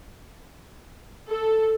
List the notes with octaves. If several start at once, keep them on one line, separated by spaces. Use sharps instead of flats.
A4